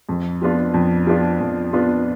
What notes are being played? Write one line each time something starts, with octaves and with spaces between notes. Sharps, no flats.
F2
F3 B3 D4 F4
F2
F3 B3 D4 F4
F2
F3 B3 D4 F4